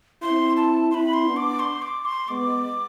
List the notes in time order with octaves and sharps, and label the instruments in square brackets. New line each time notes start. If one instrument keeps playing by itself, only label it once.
[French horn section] C4 E4 [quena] C6
[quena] A5
[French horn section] C4 E4 [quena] C6
[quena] B5
C6
[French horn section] B3 D4
[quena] D6
C6
D6
C6
[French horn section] G#3 B3 [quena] D6